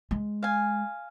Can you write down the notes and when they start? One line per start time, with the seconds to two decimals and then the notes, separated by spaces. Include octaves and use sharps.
0.11 G#3
0.43 F5 G#5